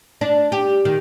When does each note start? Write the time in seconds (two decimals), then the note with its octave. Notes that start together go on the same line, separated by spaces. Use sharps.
0.21 D4
0.52 G4
0.85 D#3